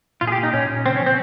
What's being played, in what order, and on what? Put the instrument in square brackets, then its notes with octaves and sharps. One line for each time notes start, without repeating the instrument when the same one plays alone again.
[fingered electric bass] A#2 [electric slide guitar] F4
[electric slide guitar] G#4
G4
[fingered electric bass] A#3
[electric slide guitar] D#4
[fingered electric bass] A#2 [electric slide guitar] C#4
[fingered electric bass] A#2
[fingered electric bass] C#3 [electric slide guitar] C4
[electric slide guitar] C#4
[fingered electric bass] F3
[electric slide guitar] C4